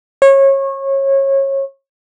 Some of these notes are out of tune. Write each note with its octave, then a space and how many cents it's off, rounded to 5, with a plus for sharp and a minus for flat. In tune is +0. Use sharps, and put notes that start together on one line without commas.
C#5 -25